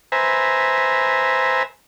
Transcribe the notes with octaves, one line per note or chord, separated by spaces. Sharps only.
B4 C5 E5 G#5 A#5